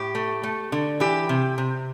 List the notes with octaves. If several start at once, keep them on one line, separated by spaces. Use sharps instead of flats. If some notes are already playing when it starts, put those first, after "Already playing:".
Already playing: A2 G4
A3
A3
D3
E3 G4
C3
C3